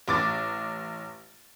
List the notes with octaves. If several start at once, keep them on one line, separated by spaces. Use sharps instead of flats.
A1 D6 A6